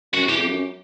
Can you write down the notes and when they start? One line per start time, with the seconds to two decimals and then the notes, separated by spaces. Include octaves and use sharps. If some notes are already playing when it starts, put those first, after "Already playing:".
0.13 F#2 F#4
0.26 E2 G4
0.37 F2
0.48 F#2